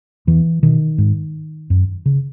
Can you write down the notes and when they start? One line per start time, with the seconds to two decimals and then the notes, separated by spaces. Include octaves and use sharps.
0.27 E2 E3
0.63 B2 D#3
0.98 G#2
1.70 F#2
2.06 C#3